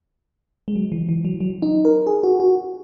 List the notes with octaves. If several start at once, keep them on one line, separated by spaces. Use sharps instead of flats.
G#3
F#3
E3
E3
F#3
F#3
D#4
A#4
G#4
F#4
F#4